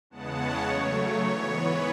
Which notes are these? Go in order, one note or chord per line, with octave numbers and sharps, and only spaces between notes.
E2 C#3 G#3 B3 F#5 A5
C#5
C#3 F#3 A3 C#5
C#5
G#2 E3 B3 C#5
B4